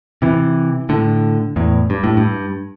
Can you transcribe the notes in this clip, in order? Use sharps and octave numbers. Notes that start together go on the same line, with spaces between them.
C3 E3
A2 D3
E2 A2
G2
A2
G2